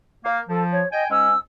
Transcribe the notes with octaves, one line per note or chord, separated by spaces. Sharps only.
A#3 F5
F3 A4
C#5
D#5 G5 G#5
G#2 G#3 C#4 E6